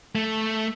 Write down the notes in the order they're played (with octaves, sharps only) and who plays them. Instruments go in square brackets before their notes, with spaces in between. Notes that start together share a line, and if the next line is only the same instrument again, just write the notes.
[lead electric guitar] A3